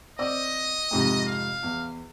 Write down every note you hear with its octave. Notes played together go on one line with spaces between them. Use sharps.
C4 D5 D#5 E6
F2 G#2 C3
F5
E2